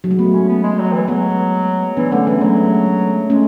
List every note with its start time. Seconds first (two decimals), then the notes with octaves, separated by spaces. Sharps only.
0.04 F#3
0.11 G#3
0.19 A3 B3
0.35 C#4
0.49 B3
0.63 G#3
0.79 F#3
0.93 E3
1.08 F#3 G#3 B3
1.97 E3 B3 D4
2.12 D3 A3 C#4
2.26 E3 G#3 B3
2.41 F#3 A3
2.63 G#3
2.86 A3
3.30 G#3 A3 C#4